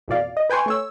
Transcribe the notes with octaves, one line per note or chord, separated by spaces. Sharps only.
A1 F2 B2 D5 F5
D#5
B4 G5 G#5 C6 C#6
A3 C#5 E6